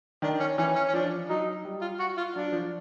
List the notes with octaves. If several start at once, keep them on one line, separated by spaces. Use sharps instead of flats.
D#3 D4
C#4
E3 C#4
C#4
C#4
F3 D4
F#3 D#4
G3
F4
F#4
F4
F#3 D4
F3